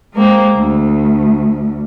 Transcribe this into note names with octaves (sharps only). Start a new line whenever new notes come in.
G#3 A#3 C4
D2